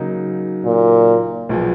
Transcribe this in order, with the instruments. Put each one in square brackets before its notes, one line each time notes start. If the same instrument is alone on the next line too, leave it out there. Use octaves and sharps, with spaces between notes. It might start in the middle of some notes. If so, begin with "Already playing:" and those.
Already playing: [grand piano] C#3 F#3 A#3 D#4
[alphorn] A#2
[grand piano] B1 A#2 F3 G#3 B3